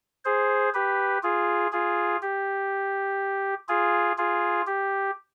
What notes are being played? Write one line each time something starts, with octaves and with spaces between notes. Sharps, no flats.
G#4 C5
G4 B4
F4 G#4
F4 G#4
G4
F4 G#4
F4 G#4
G4